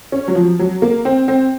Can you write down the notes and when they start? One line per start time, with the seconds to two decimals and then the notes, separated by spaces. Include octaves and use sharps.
0.12 C#4
0.28 F#3
0.35 F3
0.59 F#3
0.82 A#3
1.05 C4
1.28 C4